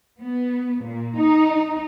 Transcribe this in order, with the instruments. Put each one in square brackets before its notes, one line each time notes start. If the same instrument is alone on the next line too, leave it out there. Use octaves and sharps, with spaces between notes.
[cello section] B3
A#2
D#4